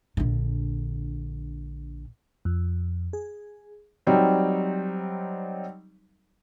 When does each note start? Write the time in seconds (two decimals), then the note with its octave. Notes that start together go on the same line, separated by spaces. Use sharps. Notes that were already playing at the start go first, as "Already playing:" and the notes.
0.17 A#1 D3
2.45 F2
3.13 G#4
4.07 F#3 G3 C4 D#4